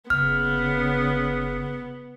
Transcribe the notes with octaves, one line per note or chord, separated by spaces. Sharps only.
F#1 C#3 B3 F6